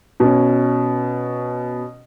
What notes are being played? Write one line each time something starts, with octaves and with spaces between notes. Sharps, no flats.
B2 C#4